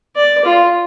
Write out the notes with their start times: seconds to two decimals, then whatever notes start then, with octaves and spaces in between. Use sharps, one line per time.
0.16 D5
0.45 F4